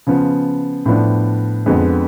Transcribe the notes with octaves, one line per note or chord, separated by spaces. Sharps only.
C#3 F3 B3
A2 F3 B3 D4
F2 D3 G#3 B3